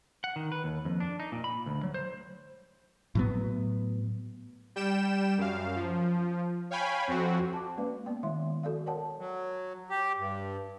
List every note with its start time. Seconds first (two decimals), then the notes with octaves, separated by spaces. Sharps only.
0.24 F#5
0.36 D#3
0.52 B4
0.64 D#2
0.85 F2
1.00 D4
1.20 D#4
1.32 A#2
1.44 B5
1.66 D2
1.83 F#3
1.94 C5
3.15 A2 F#3 B3
4.76 G3 G5 E7
5.38 F#2 F5
5.76 F3
6.71 C#5 F5 G5 G#5 B5
7.08 F2 C4 F#4
7.53 A5 D6
7.77 G#3 A#3 C#4 B4 D5 F5
8.06 B3 D5 G5
8.23 D#3 G#3 E4 E5 C6
8.63 F#4 A4 D5 F5
8.86 A#4 C#5 D5 F#5 G5 A5
9.19 F#3
9.90 G4
10.18 G2